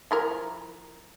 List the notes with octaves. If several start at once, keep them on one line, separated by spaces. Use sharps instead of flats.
F3 E4 A#4